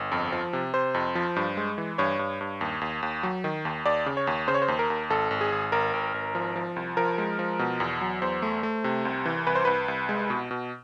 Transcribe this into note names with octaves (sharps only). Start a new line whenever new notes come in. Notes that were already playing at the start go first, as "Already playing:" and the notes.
Already playing: G1
F2
F3
C3
C3 C5
F2
F3
G2
G#3
E3
G2 C#5
G2
G2
D#2
D#2
D#2
F#3
D#3
D#2
D#2 D5
C#3
C#5
D#2
C#3 C5
C#5
C5
D#2
A#4
D#2
G#1 A4
G#1
G#4
G#1
G#1 A#4
G#1
G#1
F3
F3
C2
F3 A#4
G#3
F3
B2
E2
F#3
E2 C5
A3
A3
C3
C2
E3
C2 B4
C5
C2 B4
C2
G#3
B2
B2